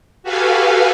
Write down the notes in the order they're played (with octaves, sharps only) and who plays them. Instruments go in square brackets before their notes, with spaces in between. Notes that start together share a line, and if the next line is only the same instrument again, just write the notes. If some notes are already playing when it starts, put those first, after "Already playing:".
[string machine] F#4 G4 A4 B4 F5 G#5